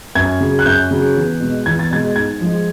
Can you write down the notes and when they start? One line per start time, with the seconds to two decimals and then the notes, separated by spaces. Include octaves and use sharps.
0.15 F#2 G#6
0.40 C#3 F#3
0.59 F#6
0.66 F#2 G6
0.91 C#3 F#3
1.16 E2
1.40 B2 G#3
1.66 E2 G#6
1.79 A6
1.91 B2 G#3 G#6
2.16 G#2 G#6
2.41 F3 G#3